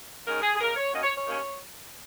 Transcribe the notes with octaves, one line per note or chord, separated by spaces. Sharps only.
G#2 D#3 G#3 C#4 A#4
G#4
G#4
C#3 A#3 D#4 A#4
C#5
F#2 F#3 A#3 C#4 D#5
C#5
C#5
D#2 D#3 A#3 C#4